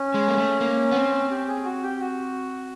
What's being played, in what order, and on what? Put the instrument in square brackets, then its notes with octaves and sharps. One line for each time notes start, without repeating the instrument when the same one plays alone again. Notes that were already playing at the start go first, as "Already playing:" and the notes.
Already playing: [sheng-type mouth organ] C#4
[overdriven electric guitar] G#3
A#3
A3
A#3
B3
C4
[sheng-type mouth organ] G4
G#4
F#4
G4
F#4